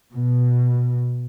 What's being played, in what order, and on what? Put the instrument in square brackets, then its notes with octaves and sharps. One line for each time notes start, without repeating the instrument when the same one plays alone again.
[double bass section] B2